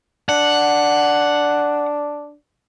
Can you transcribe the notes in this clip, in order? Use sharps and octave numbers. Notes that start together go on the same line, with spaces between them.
D4 F#5